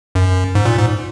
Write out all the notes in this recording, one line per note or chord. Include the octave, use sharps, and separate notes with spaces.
F#2
G#2
A#2
G#2